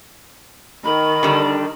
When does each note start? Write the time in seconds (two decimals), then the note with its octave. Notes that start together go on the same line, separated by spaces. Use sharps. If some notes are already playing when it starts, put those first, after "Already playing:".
0.85 D#3 B5
1.23 D3 G3 D4